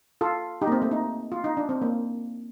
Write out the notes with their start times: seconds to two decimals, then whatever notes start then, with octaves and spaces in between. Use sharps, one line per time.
0.21 F4 A4
0.62 D#4 G4
0.67 A#3
0.72 C4
0.82 A3
0.91 D#4
1.32 F4
1.44 D#4
1.57 D4
1.69 C4
1.82 A#3